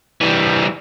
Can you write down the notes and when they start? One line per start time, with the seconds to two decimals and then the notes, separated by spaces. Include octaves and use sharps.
0.21 E3 G3